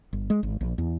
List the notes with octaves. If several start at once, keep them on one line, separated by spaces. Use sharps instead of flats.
G1
G#3
G#1
A#1
E2